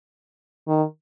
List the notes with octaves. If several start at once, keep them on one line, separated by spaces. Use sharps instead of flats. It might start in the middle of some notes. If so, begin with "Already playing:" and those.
D#3